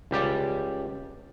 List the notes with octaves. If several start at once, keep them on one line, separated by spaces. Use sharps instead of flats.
C#2 G3 G4 D5